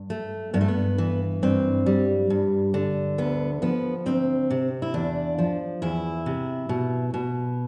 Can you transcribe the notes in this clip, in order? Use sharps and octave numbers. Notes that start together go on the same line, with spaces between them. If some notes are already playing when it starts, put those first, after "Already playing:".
Already playing: G2
A3
G2 B3
A3
B3
E3
G2 C4
G3
G2
D3
D2 B3
F3 B3
D2 C4
C3
E4
E2 D4
F3
E2 E4
C3
B2
B2